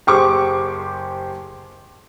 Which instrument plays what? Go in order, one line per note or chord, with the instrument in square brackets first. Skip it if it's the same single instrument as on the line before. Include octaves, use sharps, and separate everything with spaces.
[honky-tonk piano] F#1 C#6 D6 [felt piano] G4 G#4 C5